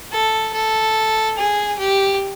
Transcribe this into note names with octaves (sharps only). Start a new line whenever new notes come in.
A4
A4
G#4
G4